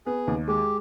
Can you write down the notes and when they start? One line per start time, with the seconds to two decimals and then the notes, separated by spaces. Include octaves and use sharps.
0.06 B3 G#4
0.27 D#2
0.48 G#3 G4